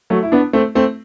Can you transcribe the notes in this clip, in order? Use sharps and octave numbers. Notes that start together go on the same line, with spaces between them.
F#3 A3
E4
B3 D4
A3 C4
A3 C4